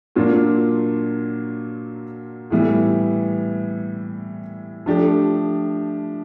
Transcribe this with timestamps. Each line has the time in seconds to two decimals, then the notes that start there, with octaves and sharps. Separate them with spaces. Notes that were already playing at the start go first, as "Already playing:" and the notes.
0.16 A#2 F#3 A#3 D4 F4
2.50 A2 E3 G3 B3
4.86 F3 A3 D4 G4